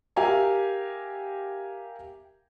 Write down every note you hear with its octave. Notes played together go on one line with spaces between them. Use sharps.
G4 A#4 E5 F5 G#5 A#5